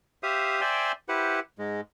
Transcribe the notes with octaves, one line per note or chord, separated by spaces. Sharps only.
G4 C5 E5 F5 D#6
C5 D5 E5 G5 G#5 C6
E4 G4 B4 C5 F#5
G#2 G#3